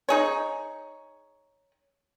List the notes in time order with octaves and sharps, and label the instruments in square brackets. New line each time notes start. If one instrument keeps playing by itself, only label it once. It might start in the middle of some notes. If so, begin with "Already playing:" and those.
[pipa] D#4 G#4 C#5